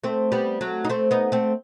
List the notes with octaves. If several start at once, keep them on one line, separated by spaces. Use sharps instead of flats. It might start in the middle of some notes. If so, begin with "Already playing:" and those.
A3 C4
G3 B3
F#3 A3
D#4
A3 C4
B3 D#4
A3 C4